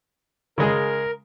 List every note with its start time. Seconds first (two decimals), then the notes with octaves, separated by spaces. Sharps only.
0.58 C#3 G#3 G#4 A#4